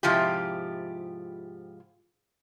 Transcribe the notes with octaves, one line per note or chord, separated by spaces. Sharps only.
G#2 C3 F3 E4 F4 G4